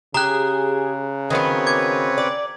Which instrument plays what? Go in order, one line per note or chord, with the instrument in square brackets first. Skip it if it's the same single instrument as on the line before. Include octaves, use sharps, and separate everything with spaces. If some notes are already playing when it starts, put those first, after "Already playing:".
[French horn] C#3 [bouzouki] G4 G#4 [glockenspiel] A#5 F#6
[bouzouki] D#3 F#3 B3 [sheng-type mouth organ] C4 B4 C#5
[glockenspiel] D6 G#6
[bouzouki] D5